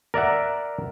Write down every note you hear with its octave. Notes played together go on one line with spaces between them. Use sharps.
A#4 D5 E5 F#5